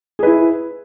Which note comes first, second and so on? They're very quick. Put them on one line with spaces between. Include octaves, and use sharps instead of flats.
G#4 B4 E4